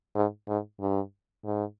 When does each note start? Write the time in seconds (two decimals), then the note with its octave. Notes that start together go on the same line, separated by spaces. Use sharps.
0.16 G#2
0.48 G#2
0.80 G2
1.45 G#2